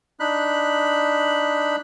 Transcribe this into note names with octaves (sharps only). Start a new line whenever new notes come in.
D4 D#4 B5 F#6